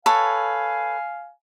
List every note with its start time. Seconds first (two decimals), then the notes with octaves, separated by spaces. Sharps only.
0.06 A4 B4 C#5 F5 G#5